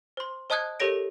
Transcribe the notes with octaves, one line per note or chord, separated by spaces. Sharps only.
C5 C6
C5 D#5 A5 D#6 F#6 G#6
G4 A4 A#4 C#5 A#6 D7